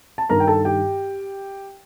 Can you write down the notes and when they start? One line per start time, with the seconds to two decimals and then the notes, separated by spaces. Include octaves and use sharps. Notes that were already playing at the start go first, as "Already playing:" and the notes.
0.18 A5
0.29 G2 D#3 A#4 A#5
0.40 G5
0.47 A4 A5
0.65 G4 G5